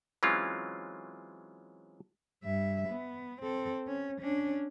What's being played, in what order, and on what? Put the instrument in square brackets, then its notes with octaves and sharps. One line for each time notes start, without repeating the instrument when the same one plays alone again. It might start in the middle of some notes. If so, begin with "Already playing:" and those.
[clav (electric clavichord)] E3 F#3 G#3 C4 C#4 F4
[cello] G2 E5
B3
C4 A4
C#4
C#4 D4